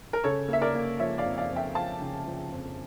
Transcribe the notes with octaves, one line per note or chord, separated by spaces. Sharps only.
A#4
C#3 A4 C#5
A#3 E5
A#4 D5
A#3
F3 C#5 E5
D5 F5
F2
D5 F5
F2
E5 G5
F3 F5 A5
C#3
F3
F2